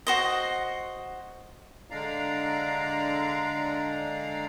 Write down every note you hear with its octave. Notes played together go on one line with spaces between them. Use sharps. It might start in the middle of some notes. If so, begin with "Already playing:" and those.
F#4 C5 D#5
D3 G#3 D4 D5 F5 A#5